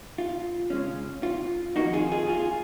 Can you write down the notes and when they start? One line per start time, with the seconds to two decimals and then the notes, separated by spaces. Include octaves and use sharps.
0.18 F4
0.70 C#3 G#3 C#4
1.23 F4
1.76 F2 D#3 A#3 D#4 F#4
1.93 F4 G#4
2.12 F4 G#4
2.28 F4 G#4